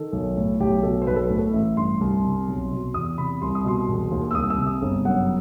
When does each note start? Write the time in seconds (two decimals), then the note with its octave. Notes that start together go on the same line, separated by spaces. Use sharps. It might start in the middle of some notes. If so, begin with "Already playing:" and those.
Already playing: D#3 A4
0.12 B1
0.37 A2
0.60 B1 G4
0.83 B2 A4
1.02 C5
1.07 B1 B4
1.16 A4
1.22 B4
1.30 A2
1.39 A4
1.53 A1 E5
1.77 G2 C6
2.01 C2
2.25 C3
2.48 B1
2.72 B2
2.94 E2 D#6
3.18 C3 B5
3.42 C2 C6
3.55 D#6
3.64 B2 C6
3.88 E1
4.11 D#2
4.31 E6
4.35 C2 D#6
4.50 E6
4.58 C3
4.66 D#6
4.82 G1
5.05 F#2 F#5